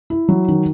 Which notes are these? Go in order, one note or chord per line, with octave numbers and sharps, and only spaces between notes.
E4
F#3
D#3